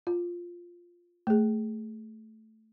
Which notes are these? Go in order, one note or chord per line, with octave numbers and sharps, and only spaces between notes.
F4
A3 G#4